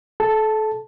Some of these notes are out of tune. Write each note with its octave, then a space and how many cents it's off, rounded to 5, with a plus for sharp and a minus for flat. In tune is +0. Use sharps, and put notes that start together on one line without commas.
A4 -30 A5 +0